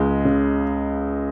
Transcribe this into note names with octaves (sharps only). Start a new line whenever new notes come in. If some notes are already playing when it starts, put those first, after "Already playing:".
Already playing: C#2 G#3
C#3